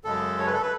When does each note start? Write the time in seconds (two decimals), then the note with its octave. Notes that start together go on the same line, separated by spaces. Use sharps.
0.04 F#2 C#3 G#3 A4
0.38 C#5
0.46 B4
0.54 A4
0.62 B4